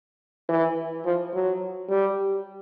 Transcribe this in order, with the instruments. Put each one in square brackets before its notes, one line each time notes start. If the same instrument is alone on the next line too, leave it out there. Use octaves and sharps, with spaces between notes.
[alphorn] E3
F3
F#3
G3